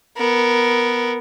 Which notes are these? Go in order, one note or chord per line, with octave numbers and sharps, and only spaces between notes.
B3 A#4